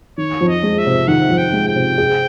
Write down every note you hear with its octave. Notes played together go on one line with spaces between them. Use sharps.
D#3 C#5
F2
D#5
G#3
E5
C3
D#3 F#5
F2
G5
G#3
G5
C3
G#4